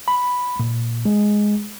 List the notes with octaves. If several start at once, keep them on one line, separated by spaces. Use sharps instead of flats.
B5
A#2
G#3